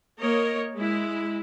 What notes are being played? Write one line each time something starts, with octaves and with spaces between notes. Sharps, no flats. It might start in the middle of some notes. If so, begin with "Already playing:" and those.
A#3 A#4 C#5 D#5
G#3 E4